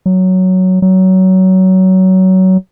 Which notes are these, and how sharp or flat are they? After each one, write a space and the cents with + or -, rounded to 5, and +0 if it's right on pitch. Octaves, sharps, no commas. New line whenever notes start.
F#3 +5
F#3 +20